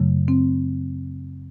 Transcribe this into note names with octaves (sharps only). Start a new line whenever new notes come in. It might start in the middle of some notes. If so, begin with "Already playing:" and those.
Already playing: F#2 C#3 F#3 A3
C4